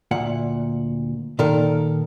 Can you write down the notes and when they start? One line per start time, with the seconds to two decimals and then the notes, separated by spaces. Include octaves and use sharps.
0.11 D2 A#2 F#5
1.39 A#2 D#3 A4 A#4